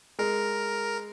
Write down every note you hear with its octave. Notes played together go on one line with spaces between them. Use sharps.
G#3 A#4